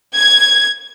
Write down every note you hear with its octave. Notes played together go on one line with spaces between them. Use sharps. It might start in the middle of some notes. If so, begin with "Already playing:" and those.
G#6